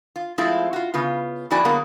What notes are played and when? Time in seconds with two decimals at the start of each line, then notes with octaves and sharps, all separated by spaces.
0.16 F4
0.38 F3 G#3 A3 C4 E4 F4
0.73 F4 F#4
0.94 C#3 B3 F4
1.51 F2 A#3 E4 F#4 D5 G#5
1.65 D3 F#3 G#3 A#3 B3 A#5